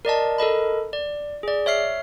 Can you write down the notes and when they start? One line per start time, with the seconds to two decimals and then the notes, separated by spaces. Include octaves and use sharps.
0.05 A#4 D5 D#5 A5
0.38 A4 A#4 D#5 B5
0.93 D5
1.43 G#4 D5
1.66 C#5 E5 F6 C7